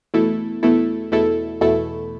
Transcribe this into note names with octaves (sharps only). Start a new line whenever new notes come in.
E2 B2 A3 E4 A4
E2 B2 A3 E4 A4
E2 B2 A3 E4 A4
E2 B2 A3 E4 A4